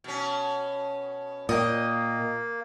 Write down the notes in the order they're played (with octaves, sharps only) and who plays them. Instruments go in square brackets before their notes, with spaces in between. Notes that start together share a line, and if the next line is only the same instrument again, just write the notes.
[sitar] B2 C#4
[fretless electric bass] A#2 [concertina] A#3 [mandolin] D#5 G5